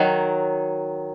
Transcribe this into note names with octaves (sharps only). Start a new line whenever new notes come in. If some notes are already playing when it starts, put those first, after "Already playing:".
Already playing: D#3 F#3